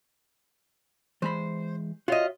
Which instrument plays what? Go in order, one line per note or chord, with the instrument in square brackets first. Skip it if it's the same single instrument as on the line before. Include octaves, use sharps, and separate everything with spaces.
[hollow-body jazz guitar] E3 G#3 B5 [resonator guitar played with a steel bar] C5
[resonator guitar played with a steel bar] F4 D#5 [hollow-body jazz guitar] F#4 C#5 E5